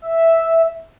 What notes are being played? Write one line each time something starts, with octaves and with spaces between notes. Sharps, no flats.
E5